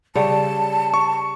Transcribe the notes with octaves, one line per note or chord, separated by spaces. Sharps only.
C#3 G3 C#5 A5
C#6